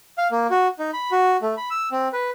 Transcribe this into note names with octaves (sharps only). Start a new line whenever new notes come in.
F5
A#3
F#4
D#4
B5
F#4
A3
B5
E6
C4
B4